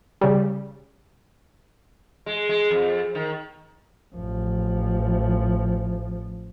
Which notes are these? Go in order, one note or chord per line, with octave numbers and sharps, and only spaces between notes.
C#3 G3
G#3
G#3
F2
D#3
A1 F3